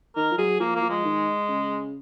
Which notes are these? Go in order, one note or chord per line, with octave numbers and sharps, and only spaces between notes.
D#3 A#4
F3
F#3 G#4
F3 A#3
A#3
F3
G#3
D#3
C#3